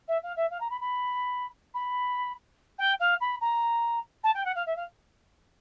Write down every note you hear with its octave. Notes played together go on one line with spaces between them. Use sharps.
E5
F5
E5
F5
A#5
B5
B5
B5
G5
F5
B5
A#5
A5
G5
F#5
F5
E5
F5